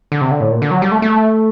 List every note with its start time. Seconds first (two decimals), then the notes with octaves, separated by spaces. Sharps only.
0.12 D3
0.21 C3
0.31 D3
0.40 A2
0.51 A#2
0.62 D3
0.71 F#3
0.82 G3
0.92 A3
1.02 A3